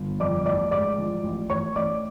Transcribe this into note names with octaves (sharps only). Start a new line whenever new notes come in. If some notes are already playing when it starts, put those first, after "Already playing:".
Already playing: G1
F2 D5 D6
A1 D5 D6
G#2 D5 D6
F3
A1
A1 C#5 C#6
A1 D5 D6